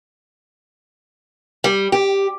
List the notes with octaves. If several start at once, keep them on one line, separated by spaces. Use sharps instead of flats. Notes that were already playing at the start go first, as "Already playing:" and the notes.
G3
G4